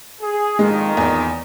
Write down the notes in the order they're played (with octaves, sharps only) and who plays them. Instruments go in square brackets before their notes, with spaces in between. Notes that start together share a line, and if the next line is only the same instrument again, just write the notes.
[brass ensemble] G#4
[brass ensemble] F2 A#2 D#3 [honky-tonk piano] G#3
[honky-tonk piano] E2